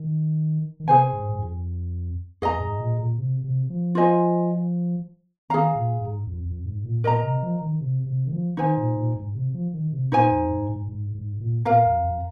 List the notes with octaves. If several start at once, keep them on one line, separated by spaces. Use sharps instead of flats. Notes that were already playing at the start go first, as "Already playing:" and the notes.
Already playing: D#3
D#3
C3 G#4 C5 G#5
G#2
G#2
F2
F2 G#4 D#5 A#5
G#2
A#2
A#2
C3
C3
F3
F4 C5 D#5 G#5
D#3 G#4 F5 A#5
A#2
G#2
F2
F2
G#2
A#2
A#2 A#4 D#5 A#5
C3
F3
D#3
C3
C3
D#3
F3
D#3 D#4 C5 G#5
A#2
A#2
G#2
C3
F3
D#3
C3
A#2 D#4 C5 G#5
F2
G#2
G#2
G#2
G#2
A#2
A#2 A#4 F5 A#5
F2
F2